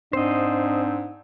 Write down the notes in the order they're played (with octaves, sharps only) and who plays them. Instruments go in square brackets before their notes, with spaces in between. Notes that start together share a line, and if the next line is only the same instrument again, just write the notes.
[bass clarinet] G#2 [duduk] C4 [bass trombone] D4 [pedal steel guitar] C5 D#5